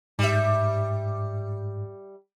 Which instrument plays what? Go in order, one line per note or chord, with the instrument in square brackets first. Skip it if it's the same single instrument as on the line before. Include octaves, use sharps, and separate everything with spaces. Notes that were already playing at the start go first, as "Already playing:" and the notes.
[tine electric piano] G#2 [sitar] G3 E5